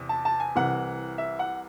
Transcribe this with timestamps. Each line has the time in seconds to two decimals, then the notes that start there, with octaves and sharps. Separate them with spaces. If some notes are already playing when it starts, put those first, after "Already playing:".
Already playing: E2 C3
0.09 A5
0.25 A5
0.40 G#5
0.55 C2 C3 E3 F#5
1.18 E5
1.39 F#5